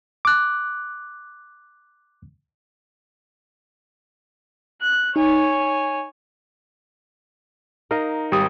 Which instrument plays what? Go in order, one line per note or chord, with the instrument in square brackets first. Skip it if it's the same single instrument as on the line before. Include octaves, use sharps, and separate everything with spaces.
[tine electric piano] D6 F#6
[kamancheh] F#6
[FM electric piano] D#4 [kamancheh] C#5 G#5
[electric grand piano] D#4 [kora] A#4 D#5 F5
[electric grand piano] G#1 D#6 [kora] G3